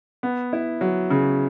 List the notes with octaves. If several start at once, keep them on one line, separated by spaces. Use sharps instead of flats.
B3
E4
F#3
C#3